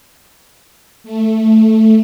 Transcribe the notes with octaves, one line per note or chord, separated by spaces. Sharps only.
A3